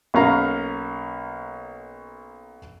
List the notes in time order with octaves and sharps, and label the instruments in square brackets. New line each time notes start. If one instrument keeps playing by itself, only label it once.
[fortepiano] B1 A#3 C#4 F5 A#5